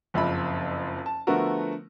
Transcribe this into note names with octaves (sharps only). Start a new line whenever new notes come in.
F#1 F2 E5 B5
A5
D3 F3 A3 B3 F#4 A#4